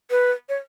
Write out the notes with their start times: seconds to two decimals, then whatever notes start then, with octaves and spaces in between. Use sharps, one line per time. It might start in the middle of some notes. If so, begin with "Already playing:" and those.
0.11 B4
0.49 C#5